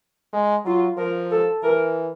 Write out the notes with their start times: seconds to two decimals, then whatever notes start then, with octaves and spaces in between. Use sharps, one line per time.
0.33 G#3
0.65 F#3 F4
0.97 F3 A#4
1.31 A4
1.63 E3 A#4